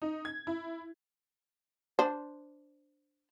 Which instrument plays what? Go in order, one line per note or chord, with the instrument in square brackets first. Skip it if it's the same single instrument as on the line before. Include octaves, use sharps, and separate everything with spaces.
[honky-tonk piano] D#4
G#6
E4
[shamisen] D4 C5